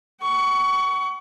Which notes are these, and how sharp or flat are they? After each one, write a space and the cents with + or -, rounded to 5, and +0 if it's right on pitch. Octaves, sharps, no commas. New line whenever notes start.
F#5 +35 C#6 +20